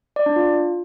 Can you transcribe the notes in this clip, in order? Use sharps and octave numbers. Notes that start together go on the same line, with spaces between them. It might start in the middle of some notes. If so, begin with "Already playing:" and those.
D5
D4
F4